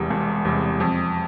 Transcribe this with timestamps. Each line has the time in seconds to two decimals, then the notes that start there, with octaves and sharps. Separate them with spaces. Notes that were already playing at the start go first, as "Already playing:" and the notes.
Already playing: E1 E2 C3 G3
0.10 E1
0.45 E2 C3 G3
0.80 F2